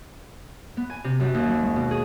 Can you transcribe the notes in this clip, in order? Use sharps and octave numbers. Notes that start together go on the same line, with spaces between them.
B3
G#5
C3
F#2
D#2
F#3
G#3
B2
G#4